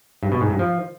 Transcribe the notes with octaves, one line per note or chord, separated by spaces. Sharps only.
G2
B2
G#2
G2
F3